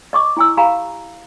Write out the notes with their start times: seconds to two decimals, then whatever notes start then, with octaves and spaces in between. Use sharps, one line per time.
0.13 D#5 C#6 D6
0.37 E4 G#5 E6
0.57 G4 F5 G#5 A#5 B5